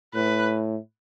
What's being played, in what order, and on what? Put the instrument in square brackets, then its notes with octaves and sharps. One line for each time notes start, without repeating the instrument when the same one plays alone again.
[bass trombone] A2 [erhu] B4